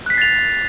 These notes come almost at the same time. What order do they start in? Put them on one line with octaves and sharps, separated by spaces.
F#6 B6 C7 A6 F7